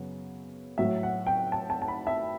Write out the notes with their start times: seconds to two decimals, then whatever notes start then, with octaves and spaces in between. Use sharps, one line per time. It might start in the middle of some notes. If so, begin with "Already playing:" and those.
Already playing: F#2 C#3 B3
0.78 A2 F#3 A3 E5
1.03 F#5
1.26 G5
1.52 A5
1.70 A5
1.82 A5
1.88 B5
2.07 E5